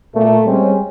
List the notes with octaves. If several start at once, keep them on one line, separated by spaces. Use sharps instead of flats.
A#2 A3 A#3
G3 G#3 C4 C#4